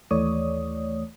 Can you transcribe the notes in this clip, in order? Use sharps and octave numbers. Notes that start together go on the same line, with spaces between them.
D#2 E3 A3 C#5 D5 D#6